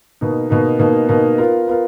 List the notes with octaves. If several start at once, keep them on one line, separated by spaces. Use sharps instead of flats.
B2 A#3 D#4
B2 A#3 D#4
B2 A#3 D#4
B2 A#3 D#4
B3 F4 A#4
B3 F4 A#4